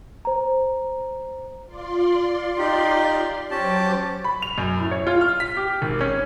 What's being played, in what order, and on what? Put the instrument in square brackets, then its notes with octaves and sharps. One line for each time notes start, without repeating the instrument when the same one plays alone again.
[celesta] C5 A#5
[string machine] F4 D5 C6
[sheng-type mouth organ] D#4 G4
[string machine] F#3 C5 D6 [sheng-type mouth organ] C#4 G4 A5
[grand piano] B5
F7
F#2
A2
C#5
F4
F6
B6
G4
G#1
C#4